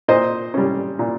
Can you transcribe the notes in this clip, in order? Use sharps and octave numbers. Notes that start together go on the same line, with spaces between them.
A#2 C5 D#5
G3 C#4
A#2